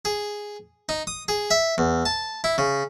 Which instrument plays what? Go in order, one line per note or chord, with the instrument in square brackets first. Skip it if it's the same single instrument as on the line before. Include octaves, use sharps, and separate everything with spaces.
[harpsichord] G#4
D#4
D#6
G#4
E5
E2
A5
E4
C#3